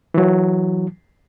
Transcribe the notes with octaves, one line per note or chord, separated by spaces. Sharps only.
E3 F#3